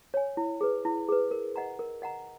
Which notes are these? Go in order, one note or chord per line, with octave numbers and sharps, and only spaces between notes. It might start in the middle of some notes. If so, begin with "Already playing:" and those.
C#5 G#5
E4
G#4 B4
E4
G#4 B4
A#4
D#5 F#5 A#5
A#4
D#5 F#5 A#5